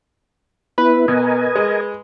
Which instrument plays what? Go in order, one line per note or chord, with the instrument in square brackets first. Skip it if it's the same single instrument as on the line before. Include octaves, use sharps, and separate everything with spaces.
[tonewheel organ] B3 E4 [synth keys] B4
[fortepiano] B2 [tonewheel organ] A#4 D#5 G#5
[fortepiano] G#3